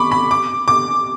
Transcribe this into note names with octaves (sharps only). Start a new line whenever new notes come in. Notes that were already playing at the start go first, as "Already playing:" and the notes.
Already playing: B5 C#6 D6
B5
D6
D6